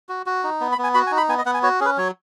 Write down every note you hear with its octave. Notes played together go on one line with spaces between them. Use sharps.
F#4
F#4
D#4
B3
B5
B3
G#5
F#4 B5
G#5
D#4
B5
B3 G#5
D#5
B3 F#5
G#5
F#4 C#5
C#4 G#4 B4
F#3 C#5